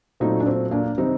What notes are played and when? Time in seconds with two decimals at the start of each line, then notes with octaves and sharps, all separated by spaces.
0.20 A#2 F#3 A3 C4 D#4
0.40 D4
0.47 C4
0.71 A#3 D4
0.98 C3 D#3 G3 C4 D#4